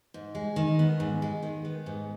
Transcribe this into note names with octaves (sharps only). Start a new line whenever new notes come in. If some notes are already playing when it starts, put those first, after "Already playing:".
G#2
G#3
D#3
B3
G#2
G#3
D#3
B3
G#2